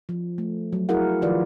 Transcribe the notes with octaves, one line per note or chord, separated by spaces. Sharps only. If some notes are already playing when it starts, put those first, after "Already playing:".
F3
A3
F#3
E4 F#4 G#4 A#4 F5 F#5
D#3 F3 F4 B4 D5